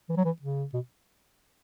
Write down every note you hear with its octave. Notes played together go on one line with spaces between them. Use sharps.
E3
F#3
E3
C#3
B2